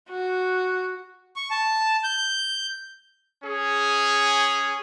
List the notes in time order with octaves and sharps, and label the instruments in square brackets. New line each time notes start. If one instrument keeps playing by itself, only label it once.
[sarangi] F#4
[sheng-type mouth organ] C#6
A5
G6
[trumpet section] C#4 G#4